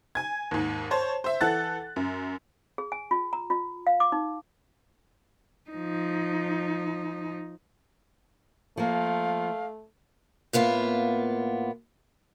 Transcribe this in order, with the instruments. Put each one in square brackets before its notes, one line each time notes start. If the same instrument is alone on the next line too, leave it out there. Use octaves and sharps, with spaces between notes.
[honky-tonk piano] G#5 G#6
D#2 G#2
C5 C#5 A5
C5 E5
E3 A4 F#5 F#6 A6
F#2
[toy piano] G#4
G#5
F4
A#5
F4
F5
D6
D#4
[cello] F3 D#4
[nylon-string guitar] F3 A#3 [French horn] A3 [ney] F5
[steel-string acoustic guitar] A2 A#3 B3 F4